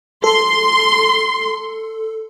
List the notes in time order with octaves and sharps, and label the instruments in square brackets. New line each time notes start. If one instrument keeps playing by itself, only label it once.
[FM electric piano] A4 [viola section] C6